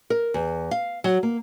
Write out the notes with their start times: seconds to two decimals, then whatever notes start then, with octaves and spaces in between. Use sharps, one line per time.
0.10 A#4
0.34 E2
0.71 F5
1.04 F#3
1.23 A#3